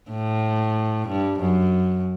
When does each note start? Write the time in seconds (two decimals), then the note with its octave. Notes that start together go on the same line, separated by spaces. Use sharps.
0.11 A2
1.08 G2
1.40 F#2